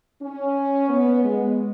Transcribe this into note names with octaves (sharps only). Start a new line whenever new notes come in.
C#4
B3
G#3